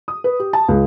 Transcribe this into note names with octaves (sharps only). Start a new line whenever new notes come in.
D#6
B4
G4
A5
C#2